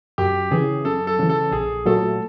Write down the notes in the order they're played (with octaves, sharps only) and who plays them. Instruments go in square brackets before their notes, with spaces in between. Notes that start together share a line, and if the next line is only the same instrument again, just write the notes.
[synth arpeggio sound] F#2 [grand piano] G4
[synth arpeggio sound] C#3 E3 [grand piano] G#4
[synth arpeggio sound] F#2 [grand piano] A4
[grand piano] A4
[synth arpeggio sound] C#3 E3
[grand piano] A4
[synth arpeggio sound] A#1 [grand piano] G#4
[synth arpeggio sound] A#2 F#3 A3 [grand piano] A4